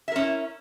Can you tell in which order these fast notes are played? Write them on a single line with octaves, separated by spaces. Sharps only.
E5 A#4 C#4 E4